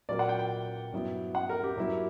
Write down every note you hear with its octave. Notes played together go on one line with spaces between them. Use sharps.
A#2 F#3 A#3 D5
F#5
G5
G5
G2 F#3 B3 E4
F#5
A#4
G4
G2 F#3 A#3 E4